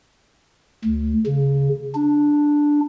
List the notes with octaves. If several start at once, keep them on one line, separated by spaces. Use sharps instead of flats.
D2
C#3
D4